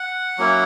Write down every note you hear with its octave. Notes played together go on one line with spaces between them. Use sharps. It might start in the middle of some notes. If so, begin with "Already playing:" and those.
Already playing: F#5
F#3 A#3 C#4 E4